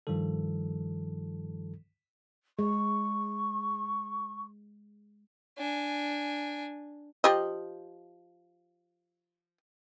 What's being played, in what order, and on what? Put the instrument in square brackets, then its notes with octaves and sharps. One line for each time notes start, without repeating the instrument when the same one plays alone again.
[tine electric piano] G2 D#3 F3 G3 A4
[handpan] G#3 [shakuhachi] C#6
[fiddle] D4 G#5
[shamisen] F3 G4 D#5